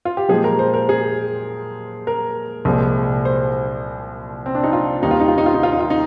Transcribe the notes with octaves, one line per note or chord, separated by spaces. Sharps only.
F4
G4
A#2 F3 G#3 G#4
A#4
C5
A#4
G#4
A#4
C2 A#2 F3 G#3
C5
C4
D4
D#4
F4
D#2 D#3 G3 A#3 D#4
F4
D#4
F4
D#4
F4
D#4
F4
D#4
F4
D#4